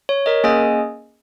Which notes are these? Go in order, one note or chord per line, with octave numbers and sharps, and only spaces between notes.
C#5
A#4 D#5
A#3 C#4 G#4 D#5 G#5